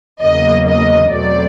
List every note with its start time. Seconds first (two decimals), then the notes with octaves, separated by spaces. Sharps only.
0.21 E2 C#3 F#3 A#3 D#5
0.67 D#5
1.11 E2 B2 F#3 A3 C4 D5